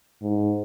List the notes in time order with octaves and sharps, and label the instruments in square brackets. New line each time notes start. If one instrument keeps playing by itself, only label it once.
[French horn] G#2